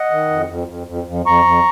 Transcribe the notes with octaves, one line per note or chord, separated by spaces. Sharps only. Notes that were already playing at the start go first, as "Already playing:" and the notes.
Already playing: D#5 F#5
D#3
F2
F2
F2
F2
F2
F2 A#5 C#6
F2